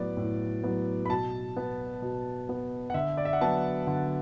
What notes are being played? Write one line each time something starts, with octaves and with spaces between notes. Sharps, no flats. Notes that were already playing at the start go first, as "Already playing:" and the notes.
Already playing: A2 F#3 B3 D5
A2
F#3 B3
B5
B2 A5
B3
B2
B3
F#5
D3 E5
D5
E5
F#5
F#3 B3 A5
D3 F#5